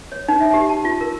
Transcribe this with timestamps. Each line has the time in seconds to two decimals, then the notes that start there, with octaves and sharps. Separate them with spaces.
0.12 C#5
0.28 D#4
0.40 E5
0.54 G4
0.69 A5
0.85 F4
1.01 A#4